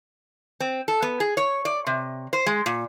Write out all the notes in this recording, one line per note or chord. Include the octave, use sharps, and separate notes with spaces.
C4
A4
B3
G#4
C#5
D5
C3
C5
G#3
A#2